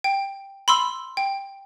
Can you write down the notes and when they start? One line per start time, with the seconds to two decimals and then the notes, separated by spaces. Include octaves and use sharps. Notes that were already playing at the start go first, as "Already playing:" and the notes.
0.04 G5
0.68 B5 C6 E6
1.17 G5